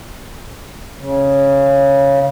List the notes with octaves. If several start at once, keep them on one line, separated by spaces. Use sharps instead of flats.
C#3